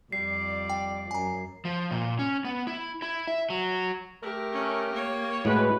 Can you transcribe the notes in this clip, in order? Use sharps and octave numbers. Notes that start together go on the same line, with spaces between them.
F2 G3 D5 C7
G5
F#2 G#5 A#5
F3
A#2
C#4
B3
E4
E4
E5
F#3
A3 G4 A#4
C#4
A#3 C#5
A2 G#3 F#4 B4